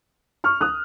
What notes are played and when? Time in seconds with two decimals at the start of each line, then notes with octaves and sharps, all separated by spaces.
0.44 C#6 F6
0.61 D#6 F#6